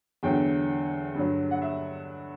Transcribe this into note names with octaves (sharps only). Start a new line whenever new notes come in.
E2 D3 F#3 G5
G2 D3 F#3
F#5
E5